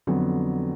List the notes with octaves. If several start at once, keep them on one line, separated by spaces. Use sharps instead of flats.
F2 D3 F#3 B3